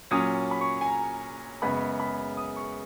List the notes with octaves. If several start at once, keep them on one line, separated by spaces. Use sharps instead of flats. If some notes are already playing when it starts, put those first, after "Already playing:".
A#2 F#3 C#4 D#6
B5
C#6
G#5
A#5
F#2 C#3 G#3 B3 B5
B5
D#6
C#6